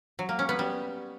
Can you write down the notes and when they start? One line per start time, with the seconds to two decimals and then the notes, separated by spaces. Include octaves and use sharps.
0.19 F#3
0.29 A#3
0.39 C#4
0.49 B3
0.59 G3